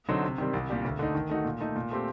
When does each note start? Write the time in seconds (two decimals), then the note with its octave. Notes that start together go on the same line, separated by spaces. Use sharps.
0.08 D3 F#3 C4 D#4
0.23 C3
0.38 D#3 G3 C4
0.54 C2
0.70 A#2 G3 D4 G4
0.85 D2
0.99 D3 A3 D#4
1.15 D#3
1.29 A3 D#4 F#4
1.45 A#2
1.60 A3 D#4
1.76 A#2
1.91 A3 C4 G4